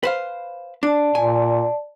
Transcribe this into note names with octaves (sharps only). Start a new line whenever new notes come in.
B4 C5 F5
D4 D5 A5
A#2 G#5